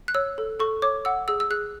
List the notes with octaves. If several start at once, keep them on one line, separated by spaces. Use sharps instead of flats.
F#6
C#5 E6
A4
A4 C#6
C#5 D6
F#5 E6
G#4 E6
E6
G#4 F#6